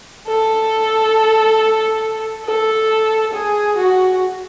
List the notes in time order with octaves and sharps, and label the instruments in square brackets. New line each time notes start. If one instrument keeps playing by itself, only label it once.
[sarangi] A4
A4
G#4
F#4